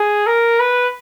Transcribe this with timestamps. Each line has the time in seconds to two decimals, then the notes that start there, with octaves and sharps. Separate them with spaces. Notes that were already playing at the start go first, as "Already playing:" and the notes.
Already playing: G#4
0.27 A#4
0.60 B4